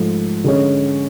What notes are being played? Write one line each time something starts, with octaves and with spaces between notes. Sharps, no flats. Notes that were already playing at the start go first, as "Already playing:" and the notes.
Already playing: G#2 F3 A3
D3 G#3 C#4